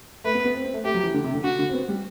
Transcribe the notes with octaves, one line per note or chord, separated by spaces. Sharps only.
A3 B4
B3
B3
C4
C4
A3
A3 G4
F#3
E3
D3
C3
D3
D3 F#4
D3
C4
B3
G3